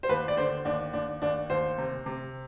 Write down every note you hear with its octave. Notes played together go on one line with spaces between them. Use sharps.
C5
D#2 B4
D5
D3 C5
D#2 D4
D#2 D4
D#2 D4
D#2 C5
C3
C3